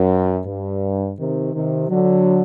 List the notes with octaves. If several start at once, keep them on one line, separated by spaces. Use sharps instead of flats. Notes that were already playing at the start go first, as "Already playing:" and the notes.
Already playing: F#2
G2
C3 D#3
C3 D#3
D3 F#3